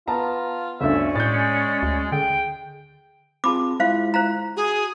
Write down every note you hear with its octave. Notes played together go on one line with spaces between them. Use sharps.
B3 F4 A5 A#5
G1 D2 C#4 D5 E5
A2 G#3 G6 A6
D2
D3 G#4 G5
C4 F4 G#4 A5 B5 D6
G#3 E4 F4 C5 F5
C5 F5 A#5
F#4 G#4